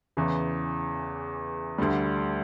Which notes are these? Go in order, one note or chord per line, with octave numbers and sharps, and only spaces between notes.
E2 C#3 E3
D2 D3 G3